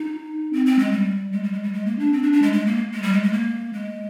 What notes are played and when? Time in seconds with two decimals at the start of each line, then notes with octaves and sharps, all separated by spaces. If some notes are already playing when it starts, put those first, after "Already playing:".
Already playing: D#4
0.53 C4
0.66 C4
0.79 G#3
0.92 G3
1.32 G#3
1.43 G3
1.53 G#3
1.63 G3
1.73 G#3
1.86 A#3
1.99 D4
2.13 C4
2.23 D4
2.33 D4
2.42 G#3
2.53 G#3
2.66 A#3
2.93 G#3
3.03 G3
3.13 G#3
3.23 G#3
3.33 A#3
3.73 G#3